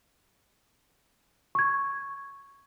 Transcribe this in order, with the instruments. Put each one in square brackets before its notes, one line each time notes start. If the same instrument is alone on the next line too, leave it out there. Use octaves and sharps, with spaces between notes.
[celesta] C#6 G#6